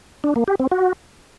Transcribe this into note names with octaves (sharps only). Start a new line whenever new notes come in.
D4
A#3
G4
C4
F#4